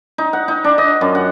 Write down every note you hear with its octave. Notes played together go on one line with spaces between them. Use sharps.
D#4
F#5
D#4
D4
D#5
F#2
F#5